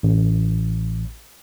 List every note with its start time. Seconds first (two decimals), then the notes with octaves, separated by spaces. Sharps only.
0.03 A1